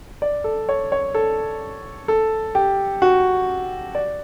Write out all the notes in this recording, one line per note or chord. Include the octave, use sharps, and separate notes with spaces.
D5
A4
C#5
C#5
A4
A4
G4
F#4
D5